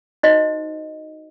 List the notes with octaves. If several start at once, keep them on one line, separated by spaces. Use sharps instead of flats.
D#4 F#4 C5 D#5